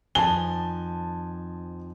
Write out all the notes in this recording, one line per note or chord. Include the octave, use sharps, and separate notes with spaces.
F2 D#3 F3 G#5 A5 G7